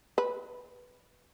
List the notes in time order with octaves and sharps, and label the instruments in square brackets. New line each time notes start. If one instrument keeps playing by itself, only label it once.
[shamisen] B4